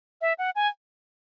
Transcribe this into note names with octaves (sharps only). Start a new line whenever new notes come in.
E5
F#5
G#5